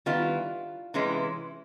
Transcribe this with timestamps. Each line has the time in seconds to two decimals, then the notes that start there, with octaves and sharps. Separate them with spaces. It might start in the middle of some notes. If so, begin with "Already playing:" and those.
0.06 D#3 G3 B3 E4 F4
0.94 C3 E3 G#3 C#4 E4